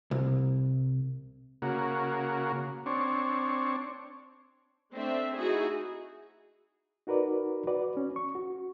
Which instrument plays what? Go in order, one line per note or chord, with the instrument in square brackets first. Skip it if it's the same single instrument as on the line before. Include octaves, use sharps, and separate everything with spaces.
[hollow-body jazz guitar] C2
[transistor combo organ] C#3 A#3 F#4
C4 D4 C#5
[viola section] A3 C4 D4 E5
D#4 E4 F#4 G#4
[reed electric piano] D#4 F#4 A#4 B4 D5
F#4 B4 D5
C#4
C#6
F#4